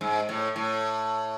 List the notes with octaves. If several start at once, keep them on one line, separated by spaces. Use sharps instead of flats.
G#2
A2
A2